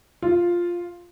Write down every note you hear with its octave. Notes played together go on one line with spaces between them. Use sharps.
F4